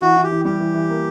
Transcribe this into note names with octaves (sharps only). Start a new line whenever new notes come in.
E3 F#4
E3
G4
E3
G3 G4
E3
E3
A#3